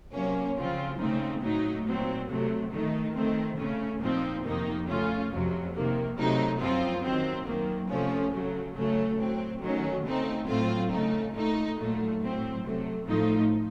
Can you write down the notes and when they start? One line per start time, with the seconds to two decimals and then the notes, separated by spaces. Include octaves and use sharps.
0.12 C3 F#3 A#3 C#4
0.56 C#3 F3 C4 F4
0.98 C#3 A3 C4 D#4
1.42 A2 F#3 A3 D#4
1.85 A#2 F#3 C4
2.29 C3 F#3 A3
2.71 D#3 A3 D#4
3.14 D#3 A3 C4
3.57 C#3 A3 C#4
4.01 A#2 F3 C4 D#4
4.44 F2 C3 D#3 A#3 D#4
4.87 C#3 A3 C#4 F4
5.31 F2 C3 F#3
5.74 C3 D#3 A#3
6.16 C3 F#3 A3 D#4
6.59 F#2 F3 C4 F4
7.02 D#3 F#3 C4
7.46 F#2 D#3 A#3
7.88 C3 F3 A3 C#4
8.32 C#3 F#3 A3
8.75 C#3 F#3 A3 C#4
9.17 A2 F#3 C4
9.61 D#3 F#3 A3 C#4
10.04 C#3 A3 C4 D#4
10.47 A2 F#3 A3 C4 F4
10.91 C#3 A3 D#4
11.33 A#2 A3 D#4
11.76 A#2 F#3 A3
12.20 A2 F#3 C4
12.63 C3 F#3 A3
13.06 A2 F3 A3 D#4